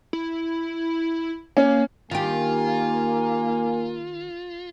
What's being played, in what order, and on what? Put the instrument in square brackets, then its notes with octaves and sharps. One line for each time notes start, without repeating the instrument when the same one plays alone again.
[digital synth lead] E4
[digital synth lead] A#3 [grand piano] C#4
[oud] D#3 G4 [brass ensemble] A#3 [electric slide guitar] F4 [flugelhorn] G#5